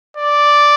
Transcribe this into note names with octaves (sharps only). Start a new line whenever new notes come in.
D5